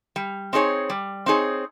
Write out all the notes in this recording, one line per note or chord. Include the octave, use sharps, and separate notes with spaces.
G3
C4 D#4 G#4 C#5
G3
C4 D#4 G#4 C#5